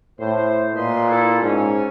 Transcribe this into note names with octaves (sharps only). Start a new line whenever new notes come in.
A2 C5
A#2 B4 D#5 C6
E4 A4
G#2 C#4